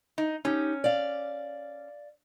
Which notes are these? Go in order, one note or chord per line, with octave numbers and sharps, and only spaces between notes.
D#4
C#4 D#4 G4
D5 F5